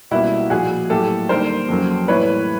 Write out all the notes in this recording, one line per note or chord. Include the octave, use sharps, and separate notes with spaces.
C#2 B2 G3 A#3 E4 F#4
A#2 F3 A#3 F#4 G#4
A2 F#3 A#3 G4 A4
D#2 D3 G3 A#3 A#4 C5
F2 C#3 F#3 A#3
A2 E3 G3 A#3 B4 C#5